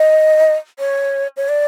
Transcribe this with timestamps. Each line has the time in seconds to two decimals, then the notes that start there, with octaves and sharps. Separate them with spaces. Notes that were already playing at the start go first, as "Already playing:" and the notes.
Already playing: D#5
0.79 C#5
1.37 C#5
1.49 D5